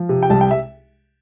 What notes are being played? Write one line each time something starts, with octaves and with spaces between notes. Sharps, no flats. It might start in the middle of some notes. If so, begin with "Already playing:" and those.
Already playing: F3
C3
G5
C2 A5
G5
E5